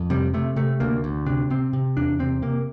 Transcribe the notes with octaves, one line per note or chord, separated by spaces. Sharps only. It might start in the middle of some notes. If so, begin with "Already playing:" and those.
Already playing: F2
C3 G3
C3 A3
C3 A3
D2 A#3
D2
C3 D4
C3 C4
C3
E2 D4
C3 C4
C3 A#3